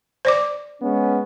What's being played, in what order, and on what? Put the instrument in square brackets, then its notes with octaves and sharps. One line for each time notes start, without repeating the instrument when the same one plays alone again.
[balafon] C5 D5 D6
[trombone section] G#3 B3 C#4